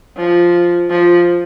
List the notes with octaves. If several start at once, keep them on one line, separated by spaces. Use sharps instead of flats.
F3
F3